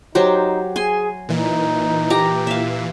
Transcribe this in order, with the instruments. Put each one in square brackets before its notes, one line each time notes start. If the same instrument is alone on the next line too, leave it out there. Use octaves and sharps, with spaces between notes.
[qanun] F#3 G4 C5 [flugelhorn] D#4
[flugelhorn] G#4 [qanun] G#5 C6
[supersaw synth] A#2 E3 [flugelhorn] D#4
[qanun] G4 A#5
E5 F5